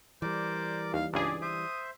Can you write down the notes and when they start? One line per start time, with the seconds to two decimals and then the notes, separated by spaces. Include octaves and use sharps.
0.22 E3 G3 A#4 C5 D5 D6
0.93 D#2 F5
1.13 C#2 G2 G4 G#4 D5
1.42 C5 E5 D#6